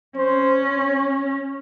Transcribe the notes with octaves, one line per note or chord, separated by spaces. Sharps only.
C#4 C5